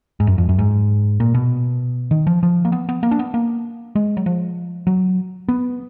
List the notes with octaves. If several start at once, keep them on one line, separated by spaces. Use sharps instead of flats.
G#2
F#2
F2
F#2
G#2
A#2
B2
D#3
F3
F3
A#3
B3
B3
A#3
D4
B3
A#3
G#3
F#3
F3
F#3
B3